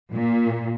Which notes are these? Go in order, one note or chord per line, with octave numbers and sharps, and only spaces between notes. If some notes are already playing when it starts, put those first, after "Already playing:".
A#2